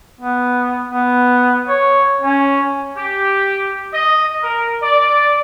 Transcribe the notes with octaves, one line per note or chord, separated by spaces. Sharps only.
B3
B3
C#5
C#4
G4
D#5
A#4
D5